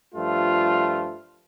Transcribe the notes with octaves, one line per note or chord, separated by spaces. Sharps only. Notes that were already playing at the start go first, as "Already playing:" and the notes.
G2 F3 A3 F4